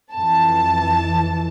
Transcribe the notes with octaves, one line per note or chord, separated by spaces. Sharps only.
F2 E3 A5